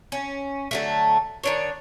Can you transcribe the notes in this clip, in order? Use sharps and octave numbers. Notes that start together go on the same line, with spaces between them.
C#4
D3 F#3 A3
D#3 D4 C#5